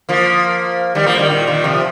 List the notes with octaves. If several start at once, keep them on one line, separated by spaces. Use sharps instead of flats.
F3 A#3
D#3 G3
F3 A#3
D#3 G3
A#2 D#3
A#2 D#3
C3 F3